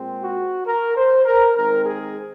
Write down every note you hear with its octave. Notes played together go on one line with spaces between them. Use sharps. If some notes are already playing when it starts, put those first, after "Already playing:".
Already playing: A#2 G#3 C4
F#4
A#4
C5
A#4
D#3 G#3 C4 A#4
G#4